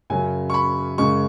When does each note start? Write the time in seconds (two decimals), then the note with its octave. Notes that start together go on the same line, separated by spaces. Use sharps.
0.10 F#2 C#3 F#3 G#5
0.50 C#6
0.54 B5
0.98 F#2 C#3 G#3 C#6